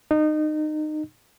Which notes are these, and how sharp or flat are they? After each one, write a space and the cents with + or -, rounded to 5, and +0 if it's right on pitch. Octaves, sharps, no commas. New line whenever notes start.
D#4 -25